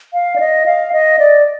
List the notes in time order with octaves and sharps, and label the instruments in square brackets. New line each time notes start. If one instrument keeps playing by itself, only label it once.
[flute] F5
D5
D#5
F5
D#5
D5